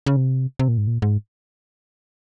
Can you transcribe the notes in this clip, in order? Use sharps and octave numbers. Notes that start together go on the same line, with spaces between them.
C#3
C3
C3
A#2
G#2
A#2
G#2